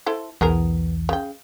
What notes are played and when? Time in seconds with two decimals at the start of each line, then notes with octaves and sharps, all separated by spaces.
0.06 E4 A4 C5
0.41 B1 E2 E3 B3 G#4 A#4
1.09 C#3 G5